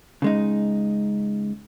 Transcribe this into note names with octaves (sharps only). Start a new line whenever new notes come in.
C#3 G#3 D#4